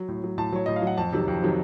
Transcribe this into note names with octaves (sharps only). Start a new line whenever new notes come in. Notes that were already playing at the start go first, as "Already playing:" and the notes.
Already playing: F#3
A2
F#3
A2 A5
F#3 C#5
A2 D#5
F5
F#3 F#5
F2 A5
C3 D#3 F#3
F2
C3 D#3 F#3